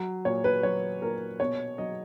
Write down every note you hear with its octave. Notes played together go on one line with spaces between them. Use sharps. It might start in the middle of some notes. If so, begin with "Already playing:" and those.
Already playing: F#3
A#2 C#5
B4
F#3 C#5
A#2 A#4
B2 C#5
F#3 D#5